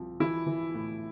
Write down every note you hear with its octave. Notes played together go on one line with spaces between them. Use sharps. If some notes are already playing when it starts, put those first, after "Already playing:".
Already playing: C2 F3
E3 E4
E3
A2